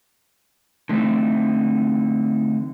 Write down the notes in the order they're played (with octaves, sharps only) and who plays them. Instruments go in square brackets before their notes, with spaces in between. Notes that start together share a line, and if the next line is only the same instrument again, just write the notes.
[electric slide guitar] D3 E3 A3 C4 D#4